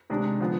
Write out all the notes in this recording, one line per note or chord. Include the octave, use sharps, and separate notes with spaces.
C3 D#3 G#3 D4
D3 F3 B3